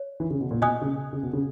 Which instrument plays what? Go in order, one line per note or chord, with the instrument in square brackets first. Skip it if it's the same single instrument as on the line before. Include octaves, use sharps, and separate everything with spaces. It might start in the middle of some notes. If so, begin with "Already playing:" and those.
Already playing: [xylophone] C#5
[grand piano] E3
C#3
B2
A#2
[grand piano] B2 [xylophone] D#5 G#5 D#6 F#6
[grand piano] C#3
C#3
B2
C#3